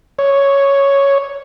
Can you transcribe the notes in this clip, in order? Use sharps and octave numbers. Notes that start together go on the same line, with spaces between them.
C#5